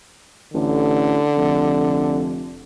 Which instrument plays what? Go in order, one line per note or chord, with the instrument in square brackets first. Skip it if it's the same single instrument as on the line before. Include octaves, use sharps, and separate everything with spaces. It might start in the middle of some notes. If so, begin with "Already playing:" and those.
[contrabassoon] A1 [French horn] D3
[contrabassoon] F1